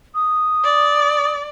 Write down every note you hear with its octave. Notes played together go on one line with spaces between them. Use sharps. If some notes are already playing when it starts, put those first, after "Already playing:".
D#6
D5